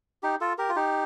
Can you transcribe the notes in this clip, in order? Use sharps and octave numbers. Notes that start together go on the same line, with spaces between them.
D#4 G4
F4 A4
G4 A#4
F4
D#4 G4